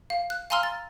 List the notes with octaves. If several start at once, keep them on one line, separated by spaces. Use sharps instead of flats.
F5
F#6
F5 G#5 A#5 C6 E6 F6
A6